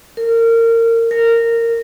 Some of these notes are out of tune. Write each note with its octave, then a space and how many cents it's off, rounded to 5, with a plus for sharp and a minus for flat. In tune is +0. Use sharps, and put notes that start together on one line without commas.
A#4 -25
A#4 -15